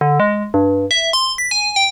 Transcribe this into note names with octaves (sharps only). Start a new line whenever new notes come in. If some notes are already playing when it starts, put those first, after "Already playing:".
D3
G#3
G2
E5
C6
B6
G#5
G5